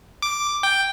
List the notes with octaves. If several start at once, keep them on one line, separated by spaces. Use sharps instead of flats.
D6
G5